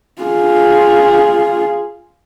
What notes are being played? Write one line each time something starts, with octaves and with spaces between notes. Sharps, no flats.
F4 G#4